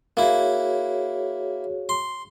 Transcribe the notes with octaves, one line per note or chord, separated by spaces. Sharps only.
A#3 E4 F#4 G#4 C#5
C6